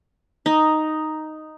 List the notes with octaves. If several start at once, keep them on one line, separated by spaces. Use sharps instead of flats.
D#4